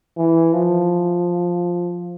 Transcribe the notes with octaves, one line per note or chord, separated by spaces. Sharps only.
E3
F3